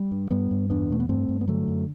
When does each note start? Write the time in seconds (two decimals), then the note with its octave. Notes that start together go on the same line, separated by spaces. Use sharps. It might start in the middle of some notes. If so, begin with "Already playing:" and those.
Already playing: G3
0.11 G2
0.31 G2 G3 B3
0.51 G2
0.70 E2 B3 D4
0.90 B2 A3
1.00 B3
1.09 G2 A3 C4
1.29 G2
1.41 B3
1.48 D3 F#3 A3
1.68 F#2